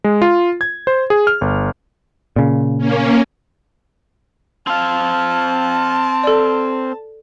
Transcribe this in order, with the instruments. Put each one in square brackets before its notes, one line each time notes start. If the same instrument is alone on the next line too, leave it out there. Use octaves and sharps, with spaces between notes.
[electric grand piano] G#3
F4
G#6
C5
G#4
F6
G1
[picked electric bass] A#2 C#3
[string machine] A#3 C#4
[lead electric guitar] C4 F5 [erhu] A5
[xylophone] A4 D5